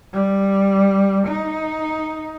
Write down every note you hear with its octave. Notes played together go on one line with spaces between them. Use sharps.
G3
D#4